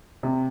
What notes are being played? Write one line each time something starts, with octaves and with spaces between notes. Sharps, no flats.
C3